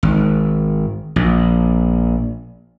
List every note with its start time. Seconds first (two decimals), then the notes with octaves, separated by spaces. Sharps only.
0.03 G#1
1.16 A#1